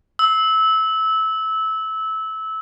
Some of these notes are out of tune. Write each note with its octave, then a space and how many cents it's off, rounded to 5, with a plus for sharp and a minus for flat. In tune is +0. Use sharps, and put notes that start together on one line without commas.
E6 -20